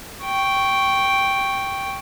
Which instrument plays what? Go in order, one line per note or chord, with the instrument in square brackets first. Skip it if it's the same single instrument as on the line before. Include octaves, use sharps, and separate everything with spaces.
[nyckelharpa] G5 C#6